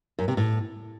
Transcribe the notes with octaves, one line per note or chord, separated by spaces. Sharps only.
F#2
C3
A2